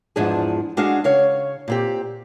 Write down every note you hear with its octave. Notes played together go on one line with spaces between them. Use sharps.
E2 G#2 F3 D4 G#4
G#3 D4 F#4 G#4 F5
C#3 C#5 F5
A#2 C4 G4